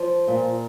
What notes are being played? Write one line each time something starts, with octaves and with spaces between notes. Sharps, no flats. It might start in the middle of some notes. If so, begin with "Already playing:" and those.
Already playing: F3
A#2